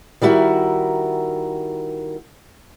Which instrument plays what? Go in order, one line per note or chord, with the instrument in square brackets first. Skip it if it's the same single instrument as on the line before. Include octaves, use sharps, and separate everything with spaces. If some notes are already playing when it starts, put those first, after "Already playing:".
[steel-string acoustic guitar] D#3 G3 E4 F#4 A#4